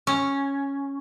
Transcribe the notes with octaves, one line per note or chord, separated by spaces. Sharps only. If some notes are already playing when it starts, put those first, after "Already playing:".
C#4